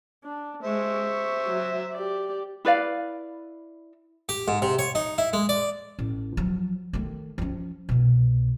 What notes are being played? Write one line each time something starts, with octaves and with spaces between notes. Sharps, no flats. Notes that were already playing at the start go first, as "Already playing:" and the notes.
D4
G#3 C5 E5 C#6
C#6
F#3
G4 D5
E4 B4 D5 F5
G4
G#2
C3
C#5
D#4
E4
G#3
D5
A1
F3 F#3
D#3 A3
F3 C#4
C2 B2